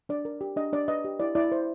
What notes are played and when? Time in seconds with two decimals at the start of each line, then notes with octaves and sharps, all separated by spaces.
0.09 D4 D5
0.25 A#4
0.41 G4
0.57 D4 D#5
0.73 D4 D5
0.88 B4 D#5
1.05 G4
1.20 E4 D5
1.35 E4 D5
1.52 C5